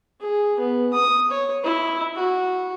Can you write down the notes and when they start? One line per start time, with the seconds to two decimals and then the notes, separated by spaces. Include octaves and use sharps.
0.21 G#4
0.60 B3
0.93 D#6
1.31 C#5
1.64 E4
2.16 F#4